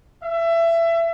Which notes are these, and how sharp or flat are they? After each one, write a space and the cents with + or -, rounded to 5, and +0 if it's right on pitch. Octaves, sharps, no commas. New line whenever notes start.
E5 +25